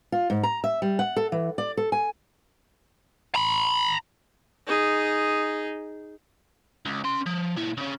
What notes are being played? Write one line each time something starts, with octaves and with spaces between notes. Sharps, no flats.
F4
G#2
A#5
E5
G3
F#5
A4
E3
D5
A4
G#5
A#5 B5
D#4 G#4
C#2
C#4 C6
F3
A#2 E4
C#3 C#4